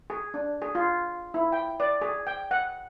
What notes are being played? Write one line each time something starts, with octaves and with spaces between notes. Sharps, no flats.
G#4
D4
G#4
F4
E4
G5
D5
G#4
G5
F#5